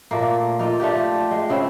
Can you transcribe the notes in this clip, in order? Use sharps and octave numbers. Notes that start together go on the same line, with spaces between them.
A#2 A3 A#3
A#3 D#4 F4 A4
A3 D4 F4 G4
G#3
C#3 C4 E4 F5